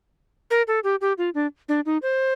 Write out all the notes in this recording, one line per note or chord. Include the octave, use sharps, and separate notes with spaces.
A#4
A4
G4
G4
F4
D4
D4
D#4
C5